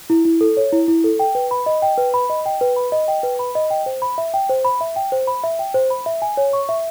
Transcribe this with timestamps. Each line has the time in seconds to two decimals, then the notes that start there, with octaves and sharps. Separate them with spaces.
0.10 E4
0.25 E4
0.41 A4
0.57 C#5
0.73 E4
0.88 E4
1.04 A4
1.20 G5
1.35 B4
1.51 B5
1.66 D#5
1.82 G5
1.98 B4
2.14 B5
2.30 D#5
2.46 G5
2.61 B4
2.76 B5
2.92 D#5
3.08 G5
3.23 B4
3.39 B5
3.55 D#5
3.71 G5
3.86 C5
4.02 B5
4.18 E5
4.34 G5
4.49 C5
4.65 B5
4.81 E5
4.96 G5
5.12 C5
5.27 B5
5.44 E5
5.59 G5
5.74 C5
5.90 B5
6.06 E5
6.22 G#5
6.37 C#5
6.53 C#6
6.69 E5